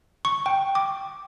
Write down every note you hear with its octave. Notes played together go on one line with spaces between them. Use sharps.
C#6
G5
D6